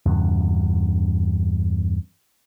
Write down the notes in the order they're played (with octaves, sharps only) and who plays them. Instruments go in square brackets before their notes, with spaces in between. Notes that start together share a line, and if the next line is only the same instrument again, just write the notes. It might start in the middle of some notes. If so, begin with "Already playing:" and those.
[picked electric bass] E2 G2 C#3